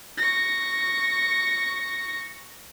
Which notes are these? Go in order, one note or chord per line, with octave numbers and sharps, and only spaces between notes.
C#6 A#6